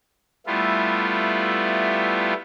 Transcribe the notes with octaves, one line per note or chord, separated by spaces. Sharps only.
G3 A3 B3 E4 F4